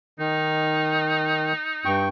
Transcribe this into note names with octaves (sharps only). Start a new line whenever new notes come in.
D#3 D#4
G2 G5 C#6